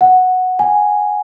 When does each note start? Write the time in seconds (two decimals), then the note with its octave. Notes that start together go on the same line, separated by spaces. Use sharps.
0.01 F#5
0.59 G#5